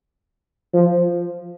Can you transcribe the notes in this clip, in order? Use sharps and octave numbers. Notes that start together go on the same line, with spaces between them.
F3